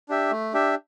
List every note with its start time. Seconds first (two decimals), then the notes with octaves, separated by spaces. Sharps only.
0.09 D4 G4 E5
0.31 A3
0.54 D4 G4 E5